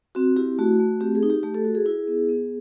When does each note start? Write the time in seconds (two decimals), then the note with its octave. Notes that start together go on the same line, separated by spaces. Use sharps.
0.15 C4 F#4
0.36 E4 G4
0.59 A3 F#4
0.80 A3
1.00 C4 G4
1.15 G#4
1.23 D#4
1.30 G4
1.43 A3 G4
1.55 A4
1.65 F#4 A4
1.75 G#4
1.86 E4
2.08 B3
2.29 B3